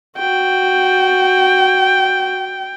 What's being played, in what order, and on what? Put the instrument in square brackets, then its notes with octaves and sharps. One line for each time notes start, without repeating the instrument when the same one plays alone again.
[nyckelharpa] F#4 [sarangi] G5